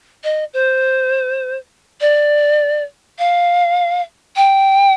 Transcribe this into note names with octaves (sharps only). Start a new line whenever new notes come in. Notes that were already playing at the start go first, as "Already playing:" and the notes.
D#5
C5
D5
F5
G5